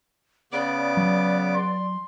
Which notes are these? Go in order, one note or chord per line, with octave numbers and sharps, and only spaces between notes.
C#3 B3 D5 D6
F#3
C6